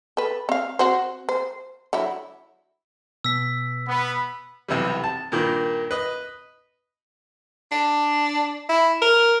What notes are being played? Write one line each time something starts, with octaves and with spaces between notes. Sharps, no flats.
A4 B4
C4 F5
C4 F#4 C5
C5
D3 F#3 E4
B2 E6 B6
B3
B1 C3 E3 G3
A5
G2 A#2 D#3
B4 D#5
D4
E4
A#4